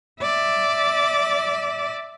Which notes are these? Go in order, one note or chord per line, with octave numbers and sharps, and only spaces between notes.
D5 E5